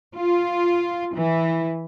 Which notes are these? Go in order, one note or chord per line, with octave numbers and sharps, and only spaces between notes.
F4
E3